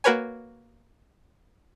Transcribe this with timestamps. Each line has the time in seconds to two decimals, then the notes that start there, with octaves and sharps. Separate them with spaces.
0.04 A#3 F#4 A#4 B4 C#5 G#5